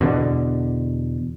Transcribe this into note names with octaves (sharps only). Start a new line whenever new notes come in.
E2 B2 D3